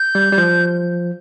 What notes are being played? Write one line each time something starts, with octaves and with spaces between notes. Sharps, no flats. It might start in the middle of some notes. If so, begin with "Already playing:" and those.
Already playing: G6
G3
G3
F3